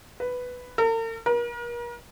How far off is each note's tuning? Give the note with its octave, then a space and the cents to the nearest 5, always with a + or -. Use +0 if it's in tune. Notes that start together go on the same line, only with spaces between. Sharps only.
B4 +5
A#4 -45
A#4 +40